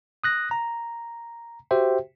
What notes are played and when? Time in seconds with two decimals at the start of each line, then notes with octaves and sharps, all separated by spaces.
0.24 D#6 F#6 A#6
0.51 A#5
1.71 F#4 G4 C5 E5 G5